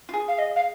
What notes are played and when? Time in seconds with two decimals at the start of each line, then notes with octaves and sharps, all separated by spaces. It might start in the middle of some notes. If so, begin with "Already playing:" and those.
0.09 F4
0.13 G#4
0.28 F5
0.38 D#5
0.56 F5